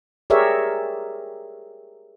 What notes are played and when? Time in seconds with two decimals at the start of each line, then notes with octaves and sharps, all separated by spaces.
0.30 G4 G#4 A#4 C#5 D5 E5